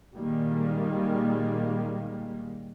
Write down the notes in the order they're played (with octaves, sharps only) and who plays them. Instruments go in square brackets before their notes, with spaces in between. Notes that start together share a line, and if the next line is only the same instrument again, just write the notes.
[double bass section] A#2 D#3 G3 G#3 A#3